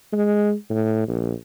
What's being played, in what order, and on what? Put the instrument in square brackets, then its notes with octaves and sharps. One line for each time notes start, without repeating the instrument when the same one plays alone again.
[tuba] G#3
A2
A#1